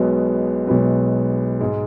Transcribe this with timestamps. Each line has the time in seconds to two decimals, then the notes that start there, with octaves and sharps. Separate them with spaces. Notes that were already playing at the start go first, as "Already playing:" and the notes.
Already playing: B1 B2 G#3 B3
0.67 B1 B2 G#3 B3
1.60 G#2 G#3